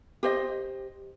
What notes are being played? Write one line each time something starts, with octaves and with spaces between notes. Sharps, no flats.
G4 C5 D#5